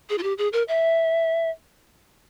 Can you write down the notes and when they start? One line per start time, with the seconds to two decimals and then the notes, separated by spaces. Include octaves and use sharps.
0.10 G#4
0.18 F4
0.23 G4
0.38 G#4
0.53 A#4
0.68 E5